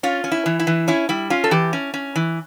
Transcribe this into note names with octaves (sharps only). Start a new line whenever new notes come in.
C#4 F4
C#4
E4
E3
E4
E3
C#4 E4
G3 E4
C#4 F4
A4
E3 G4
C#4
C#4
E3